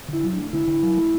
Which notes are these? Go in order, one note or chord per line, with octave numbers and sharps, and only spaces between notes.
D3 E4
F#3
A3 D4
D3 E4
D3
F#3
A3